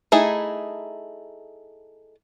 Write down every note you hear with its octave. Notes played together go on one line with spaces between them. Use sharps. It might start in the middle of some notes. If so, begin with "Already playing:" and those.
A3 D#4 E4 G#4